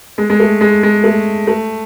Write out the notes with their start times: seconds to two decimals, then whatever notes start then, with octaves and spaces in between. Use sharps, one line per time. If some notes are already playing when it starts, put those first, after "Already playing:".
0.18 G#3
0.30 G#3
0.40 A3
0.61 G#3
0.83 G#3
1.04 A3
1.47 A3